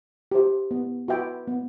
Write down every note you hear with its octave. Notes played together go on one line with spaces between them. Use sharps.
G4 C5 E5
B3
F#4 B4 E5 G5
B3